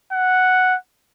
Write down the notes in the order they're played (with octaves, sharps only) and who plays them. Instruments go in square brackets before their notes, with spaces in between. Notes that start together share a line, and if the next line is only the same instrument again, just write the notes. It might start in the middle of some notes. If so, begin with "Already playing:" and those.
[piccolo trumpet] F#5